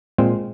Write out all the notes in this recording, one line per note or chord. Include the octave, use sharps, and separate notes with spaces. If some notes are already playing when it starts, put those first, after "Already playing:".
A#2 G#3 C4